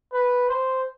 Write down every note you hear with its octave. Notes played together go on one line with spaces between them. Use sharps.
B4
C5